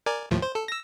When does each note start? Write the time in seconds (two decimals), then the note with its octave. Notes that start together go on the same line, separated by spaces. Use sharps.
0.06 A#4 D5 G#5
0.31 D#2 A2 F3
0.42 C5
0.55 A4
0.68 E6 A#6